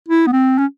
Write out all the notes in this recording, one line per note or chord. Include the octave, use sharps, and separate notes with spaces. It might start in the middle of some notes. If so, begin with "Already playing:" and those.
E4
B3
C4
C#4